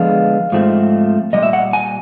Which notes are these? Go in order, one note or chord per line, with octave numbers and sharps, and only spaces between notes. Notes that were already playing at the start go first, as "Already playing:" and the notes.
Already playing: D3 F3 G#3 B3 D4 F5
G#2 F3 A3 C4
A#2 G3 D#5
E5
F#5
G#5